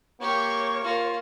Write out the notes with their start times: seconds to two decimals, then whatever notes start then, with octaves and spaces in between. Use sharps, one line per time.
0.21 A#3 G4 C#5 C#6
0.84 A#3 F4